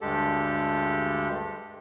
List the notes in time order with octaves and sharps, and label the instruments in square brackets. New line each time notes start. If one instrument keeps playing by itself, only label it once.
[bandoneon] D2 G2 G#3 G4 A4